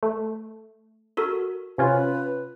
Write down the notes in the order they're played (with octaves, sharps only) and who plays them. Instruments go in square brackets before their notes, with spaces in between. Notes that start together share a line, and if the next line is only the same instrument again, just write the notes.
[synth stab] A3
[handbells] F#4 A4 A#4
[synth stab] C3 C#4 F4 [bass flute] B4